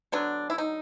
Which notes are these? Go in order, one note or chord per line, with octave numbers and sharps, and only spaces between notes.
D3 F#3 B3 D4
E4
D#4